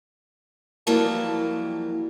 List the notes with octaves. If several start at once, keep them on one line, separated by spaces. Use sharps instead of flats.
F2 E3 F#3 G3 A#3 A5